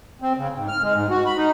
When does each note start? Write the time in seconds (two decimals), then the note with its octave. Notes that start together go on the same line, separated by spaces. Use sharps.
0.22 C4
0.37 C#3
0.55 G#2
0.68 F6
0.83 G#3
0.94 G#2
1.10 F#4
1.26 B5
1.37 D#4